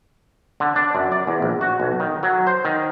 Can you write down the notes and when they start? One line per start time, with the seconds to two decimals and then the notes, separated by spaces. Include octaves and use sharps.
0.60 D3
0.76 D4
0.95 F#2
1.12 D5
1.27 E2
1.42 A#1
1.61 F#4
1.80 B1
2.00 D#3
2.23 F#3
2.47 C5
2.65 D#3